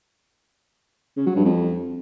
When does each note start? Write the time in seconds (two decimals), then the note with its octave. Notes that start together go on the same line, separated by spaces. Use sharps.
1.17 C#3
1.26 F#3
1.36 G2
1.45 F2